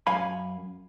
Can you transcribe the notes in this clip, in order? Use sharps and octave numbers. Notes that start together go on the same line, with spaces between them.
F#2 F5 G#5 B5